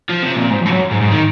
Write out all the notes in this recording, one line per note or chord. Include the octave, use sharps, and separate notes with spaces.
F3
C3
A#2
G#2
F2
G#2
F#2
G#2
G#2
D#3